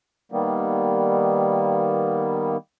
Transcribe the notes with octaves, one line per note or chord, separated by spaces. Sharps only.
D#3 G3 A#3 B3